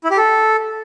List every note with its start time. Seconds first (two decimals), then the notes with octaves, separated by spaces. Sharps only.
0.04 E4
0.11 G4
0.18 A4